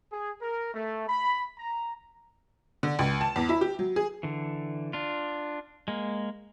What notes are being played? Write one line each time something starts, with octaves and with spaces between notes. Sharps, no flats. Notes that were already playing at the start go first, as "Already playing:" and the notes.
G#4
A#4
A3
B5
A#5
D3
C#2
A5
E2
E4
G4
F#3
G#4
D3 E3
D4 F4
G#3 A#3